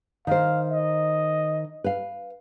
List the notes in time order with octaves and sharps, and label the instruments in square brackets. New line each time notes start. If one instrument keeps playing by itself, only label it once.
[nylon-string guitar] D#3 C5 [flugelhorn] F5
[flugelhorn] D#5
[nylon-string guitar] B4 F5